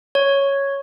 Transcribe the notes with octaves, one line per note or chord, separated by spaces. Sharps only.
C#5